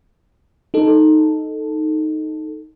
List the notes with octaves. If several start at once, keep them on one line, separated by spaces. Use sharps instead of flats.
D#4 A4